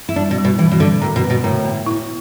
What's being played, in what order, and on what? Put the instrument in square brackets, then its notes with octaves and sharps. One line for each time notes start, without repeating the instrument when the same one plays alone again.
[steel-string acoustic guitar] E4
[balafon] G3 [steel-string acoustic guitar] D4
[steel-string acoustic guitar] B2
[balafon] G3
[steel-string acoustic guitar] B2
[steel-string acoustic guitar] E3 [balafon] G3
[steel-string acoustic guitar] B2
[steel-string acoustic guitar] D3 [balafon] G3
[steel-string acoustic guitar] A2 [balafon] D3
[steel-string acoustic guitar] B2
[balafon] B4
[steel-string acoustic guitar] B2
[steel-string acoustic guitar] A2 [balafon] D3
[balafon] B3
E4